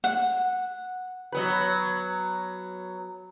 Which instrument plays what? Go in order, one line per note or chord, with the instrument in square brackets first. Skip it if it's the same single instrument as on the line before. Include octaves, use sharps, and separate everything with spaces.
[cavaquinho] F#5
[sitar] F#3 B3 B4